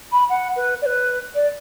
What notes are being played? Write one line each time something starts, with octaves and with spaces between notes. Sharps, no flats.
B5
F#5
B4
D5
B4
D5